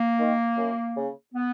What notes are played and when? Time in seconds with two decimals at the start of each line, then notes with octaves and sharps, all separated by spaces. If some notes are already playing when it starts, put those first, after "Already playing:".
Already playing: A#3
0.19 D#3
0.57 F#2
0.95 C#3
1.33 B3